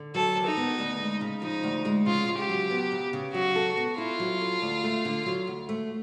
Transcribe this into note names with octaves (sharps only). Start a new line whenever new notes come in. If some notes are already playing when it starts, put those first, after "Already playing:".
Already playing: D3
F#3 A4
D#2
D#4
B3
D2
G#3
C#3
F3 D#4
D2
G#3
C#3 F4
C#3
G4
F#3
B3
C#3
C#3
F#3 F#4
A4
B3
E4 F4
F#3
A4
D2
A3
D3
F#3
D2
A3